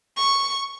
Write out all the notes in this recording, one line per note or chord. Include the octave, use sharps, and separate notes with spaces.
C#6